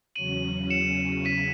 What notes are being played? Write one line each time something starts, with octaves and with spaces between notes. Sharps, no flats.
E2 C#3 F#3 C#4 D#7 F#7
C#7 E7
B6 D#7